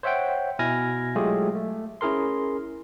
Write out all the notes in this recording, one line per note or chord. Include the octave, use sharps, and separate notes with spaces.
C5 C#5 E5 F#5 G5
B2 E4 G#5 F6 G#6 A#6
F#3 G#3 A3 F4 G4 G#4
A3
C#4 E4 G#4 A#4 C6